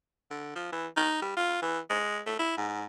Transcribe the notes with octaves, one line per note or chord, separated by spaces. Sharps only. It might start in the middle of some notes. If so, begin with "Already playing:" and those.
D3
F3
E3
D#4
G3
F4
E3
G#3
A3
E4
G#2